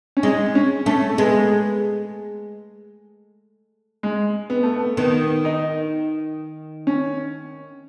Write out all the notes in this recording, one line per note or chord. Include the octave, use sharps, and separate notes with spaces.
C#4
G#3 D#4
C#4
A3 C#4
A3
G#3 B3
G#3
B3
A3
B3
D#3 B3
D#4
C#4